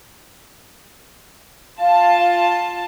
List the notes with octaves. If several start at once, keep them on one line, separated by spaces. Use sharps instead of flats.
F4 F5 A5